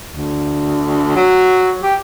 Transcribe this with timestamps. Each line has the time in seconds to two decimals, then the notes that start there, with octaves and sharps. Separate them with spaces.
0.12 D2
1.16 F#3
1.83 G4